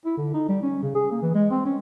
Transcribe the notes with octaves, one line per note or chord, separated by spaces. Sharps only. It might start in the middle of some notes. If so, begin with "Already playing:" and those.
E4
D3
D#4
G3
C#4
C#3
G#4
A#3
E3
G#3
C4
C#4